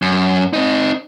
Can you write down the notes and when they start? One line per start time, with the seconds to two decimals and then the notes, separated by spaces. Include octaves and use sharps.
0.02 F#2
0.53 C4 D#4